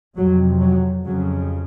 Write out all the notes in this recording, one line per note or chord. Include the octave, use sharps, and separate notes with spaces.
F2 C3 F#3
F#3
F2 C#3 F#3